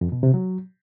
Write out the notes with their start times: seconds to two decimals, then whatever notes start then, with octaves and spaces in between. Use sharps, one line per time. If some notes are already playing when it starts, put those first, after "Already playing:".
0.01 F2
0.12 B2
0.23 C3
0.34 F#3